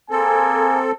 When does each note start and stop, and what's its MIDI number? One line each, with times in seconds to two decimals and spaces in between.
0.11 0.81 58
0.11 0.92 60
0.11 0.81 68
0.11 0.92 69
0.11 0.81 80